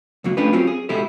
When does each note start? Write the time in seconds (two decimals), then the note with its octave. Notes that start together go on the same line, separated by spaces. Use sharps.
0.24 C#2 F#2 F#3 A#3
0.37 A3 C#4 D4 F4 G4 B4
0.53 F#3 C4 C#4 F4 G4
0.67 G#4
0.89 B2 G#3 E4 G4 A4